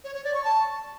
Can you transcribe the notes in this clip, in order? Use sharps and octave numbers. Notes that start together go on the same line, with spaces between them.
C#5
C#5
D5
C#6
A5